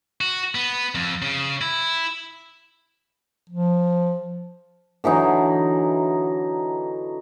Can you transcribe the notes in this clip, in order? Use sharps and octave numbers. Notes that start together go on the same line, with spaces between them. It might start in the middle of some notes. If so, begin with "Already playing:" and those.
F#4
B3
F2
C#3
E4
F3
D3 E3 F#3 D#4